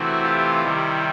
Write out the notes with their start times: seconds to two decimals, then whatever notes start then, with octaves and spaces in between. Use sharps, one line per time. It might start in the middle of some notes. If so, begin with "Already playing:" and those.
Already playing: C3 E3 A3 C4 E4 F#4
0.23 F4 G4
0.63 C3 D#3 G3 E4